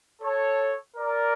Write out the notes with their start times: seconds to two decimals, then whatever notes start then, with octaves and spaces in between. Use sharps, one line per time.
0.22 A4 C#5
0.97 A#4 D5